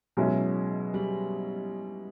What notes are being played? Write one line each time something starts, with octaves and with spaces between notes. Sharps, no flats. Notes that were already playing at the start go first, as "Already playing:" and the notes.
B2 F#3 G#3 C#4 E4
G3